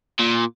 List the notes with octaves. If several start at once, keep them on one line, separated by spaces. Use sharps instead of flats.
A#2